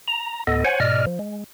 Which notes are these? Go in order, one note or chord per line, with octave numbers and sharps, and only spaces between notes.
A#5
D2 A2 B3 A4 D#5
C5 C#5 F#5 G#5
G#2 B2 D5 D#5 F6
F3
G#3